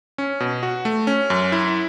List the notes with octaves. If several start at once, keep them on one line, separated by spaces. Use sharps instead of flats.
C#4
B2
F#4
A3
C#4
F#2
E4